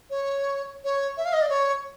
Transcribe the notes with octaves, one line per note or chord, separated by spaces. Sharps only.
C#5
C#5
E5
F5
D#5
D5
C#5